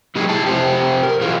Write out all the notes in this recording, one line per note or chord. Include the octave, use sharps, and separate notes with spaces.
B2 F#3 G#3 D#4 G4 G#4
E4 G4 A5
F2 G4 C5
A#4
B2 E3 F4 G#4